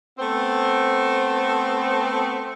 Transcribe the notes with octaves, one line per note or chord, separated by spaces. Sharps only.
A3 B3 C4